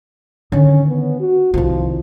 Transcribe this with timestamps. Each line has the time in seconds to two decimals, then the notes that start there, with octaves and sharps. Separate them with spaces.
0.52 D3 D#3 C#4
0.87 B3
1.20 F#4
1.54 C2 D#3 F3